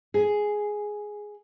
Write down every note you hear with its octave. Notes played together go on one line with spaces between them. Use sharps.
G#4